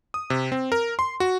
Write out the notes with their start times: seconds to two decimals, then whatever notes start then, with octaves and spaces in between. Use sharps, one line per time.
0.14 D#6
0.30 C3
0.52 C4
0.72 A#4
0.99 C6
1.20 F#4